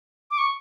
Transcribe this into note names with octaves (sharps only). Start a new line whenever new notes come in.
D6
C#6